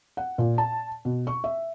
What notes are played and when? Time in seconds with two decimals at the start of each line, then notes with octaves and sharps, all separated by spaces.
0.17 F#5
0.38 A#2
0.58 A5
1.05 B2
1.27 C#6
1.44 E5